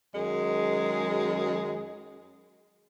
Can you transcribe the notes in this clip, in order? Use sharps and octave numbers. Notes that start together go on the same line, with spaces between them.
F#2 D#3 G#3 G#4